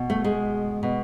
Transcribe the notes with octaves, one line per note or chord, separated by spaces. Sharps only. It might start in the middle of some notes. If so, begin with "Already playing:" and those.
Already playing: B2
A3
G#3
B2